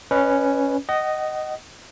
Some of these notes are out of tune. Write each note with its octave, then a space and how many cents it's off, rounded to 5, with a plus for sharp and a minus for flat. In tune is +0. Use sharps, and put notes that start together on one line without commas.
C#4 +0 B4 +0 D#5 -35
D#5 -5 F#5 +35